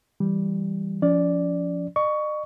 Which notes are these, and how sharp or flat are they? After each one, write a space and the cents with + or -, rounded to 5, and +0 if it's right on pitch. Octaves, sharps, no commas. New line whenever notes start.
E3 +0 G3 +0
F3 +0 C#4 +40 D5 +0
D#5 -45 C#6 +15